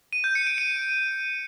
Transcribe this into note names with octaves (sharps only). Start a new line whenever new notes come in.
D#7
G6
C#7
D7
D#7